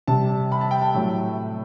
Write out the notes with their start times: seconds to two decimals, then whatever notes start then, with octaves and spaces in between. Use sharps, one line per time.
0.08 C3 G3 A5
0.52 B5
0.61 A5
0.71 G5
0.82 A5
0.95 A2 F#3